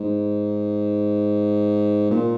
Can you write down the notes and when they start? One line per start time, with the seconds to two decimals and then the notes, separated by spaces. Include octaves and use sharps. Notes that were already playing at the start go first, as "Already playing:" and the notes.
Already playing: G#2
2.11 A#2